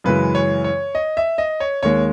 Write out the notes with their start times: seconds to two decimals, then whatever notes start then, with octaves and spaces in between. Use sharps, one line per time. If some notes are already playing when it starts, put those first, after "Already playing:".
0.04 F#2 C#3 E3 G#3 B4
0.35 C#5
0.64 C#5
0.95 D#5
1.17 E5
1.38 D#5
1.60 C#5
1.83 D#2 D#3 G#3 C#5